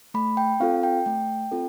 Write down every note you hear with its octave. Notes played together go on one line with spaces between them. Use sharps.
A3 B5
G5
C4 F4 A4 F5
G5
A3 G5
C4 F4 A4